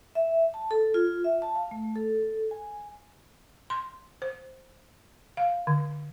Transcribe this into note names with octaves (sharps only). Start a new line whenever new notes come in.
E5
A5
A4
F4
E5
A5
F5
A3
A4
G#5
C6
C5
F5
D3